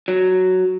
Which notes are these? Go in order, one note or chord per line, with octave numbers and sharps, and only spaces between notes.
F#3